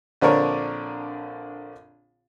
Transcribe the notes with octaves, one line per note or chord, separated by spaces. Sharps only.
A#1 D3 C4 D4 A#4 C#5